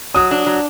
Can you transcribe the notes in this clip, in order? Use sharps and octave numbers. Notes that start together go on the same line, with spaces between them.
F#3 D#6
D4
F#3